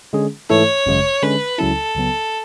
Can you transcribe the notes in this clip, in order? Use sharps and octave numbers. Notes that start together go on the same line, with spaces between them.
D3 G#3 C#4 G#4
G#2 E3 A3 E4 A4 C#5
G#1 F#2 C#3 G#3
D3 G#3 C#4 B4
C#2 C#3 F#3 C#4 E4 A4
C#2 C#3 F#3 B3